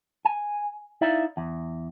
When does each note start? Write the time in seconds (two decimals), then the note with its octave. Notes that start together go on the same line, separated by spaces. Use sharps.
0.25 G#5
1.01 D#4 E4 D5 E5 F5
1.37 E2